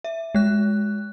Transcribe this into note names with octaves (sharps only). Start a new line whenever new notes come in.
E5
G#3 F#6